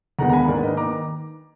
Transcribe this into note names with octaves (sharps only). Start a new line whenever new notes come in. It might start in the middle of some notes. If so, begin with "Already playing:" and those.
D#2 D3 G#3 B3 D#4 F#5 A#5
A#5
G#5 B5
G#2 D#3 A#3 D4 A#4 D5
B4 D#5
D#3 A#5 D6